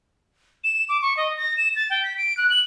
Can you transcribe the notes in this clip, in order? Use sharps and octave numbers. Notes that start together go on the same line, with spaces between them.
E7
D6
C#6
D#5
A#6
E7
A6
G5
B6
D7
F#6
F#7